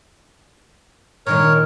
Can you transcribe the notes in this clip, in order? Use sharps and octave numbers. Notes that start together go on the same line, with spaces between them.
A#2 D#3 G#3 A#4 C#5